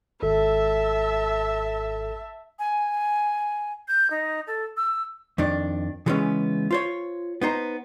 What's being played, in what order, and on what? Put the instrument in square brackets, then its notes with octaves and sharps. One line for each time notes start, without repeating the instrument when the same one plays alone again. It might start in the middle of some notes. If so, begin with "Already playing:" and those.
[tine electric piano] G#1 A4 [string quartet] E5 A5 E6
[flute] G#5
G6
D#4
A4
E6
[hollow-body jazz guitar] F2 D#3 D4
C#3 E3 G3 G#3 B3 C#4
F4 C5 C#5
B3 D#4 C5 A#5